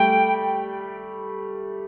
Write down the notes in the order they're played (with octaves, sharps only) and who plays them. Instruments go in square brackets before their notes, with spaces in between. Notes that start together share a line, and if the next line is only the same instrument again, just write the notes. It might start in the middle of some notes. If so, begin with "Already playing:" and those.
Already playing: [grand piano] G3 A3 [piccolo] G5